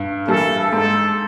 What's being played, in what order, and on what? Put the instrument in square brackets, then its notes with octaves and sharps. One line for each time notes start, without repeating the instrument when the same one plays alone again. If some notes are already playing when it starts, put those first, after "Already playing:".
Already playing: [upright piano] G2
[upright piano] E3 G3 A#3 [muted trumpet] A4
[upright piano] G#2 [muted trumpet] A4